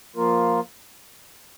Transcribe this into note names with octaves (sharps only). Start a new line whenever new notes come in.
F3 A#3 F4 A#4